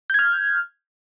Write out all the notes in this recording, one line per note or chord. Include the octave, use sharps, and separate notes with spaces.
F6 G6 G#6